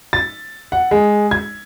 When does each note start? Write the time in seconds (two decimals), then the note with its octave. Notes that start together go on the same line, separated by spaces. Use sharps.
0.13 A6
0.72 F#5
0.91 G#3
1.31 G#6